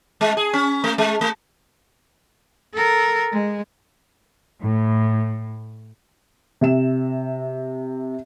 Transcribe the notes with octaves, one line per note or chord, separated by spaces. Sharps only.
G#3
G#4
C#4
A3
G#3
A3
A4 A#4
G#3
A2
C3 E5 E7